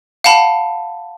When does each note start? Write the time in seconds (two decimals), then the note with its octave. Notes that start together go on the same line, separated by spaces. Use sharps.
0.24 F5 F#5 A5 B5